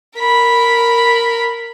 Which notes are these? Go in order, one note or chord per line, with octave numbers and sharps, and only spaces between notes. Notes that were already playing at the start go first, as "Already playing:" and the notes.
A#4 B5